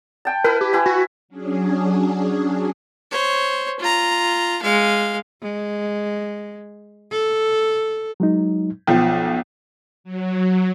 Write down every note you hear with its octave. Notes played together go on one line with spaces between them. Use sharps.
G5 A5
E4 A#4 B4
G4
E4 B4 G#5
F#4
F#3 C#4 D4 G#4
C5 C#5
F4 A#5
G#3 F5
G#3
A4
F#3 G#3 D#4
B1 F3 G5
F#3